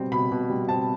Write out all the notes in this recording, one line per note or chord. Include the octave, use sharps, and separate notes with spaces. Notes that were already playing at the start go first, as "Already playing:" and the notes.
Already playing: B2 G3 C4
B2 B5
B2
G3
C4 A5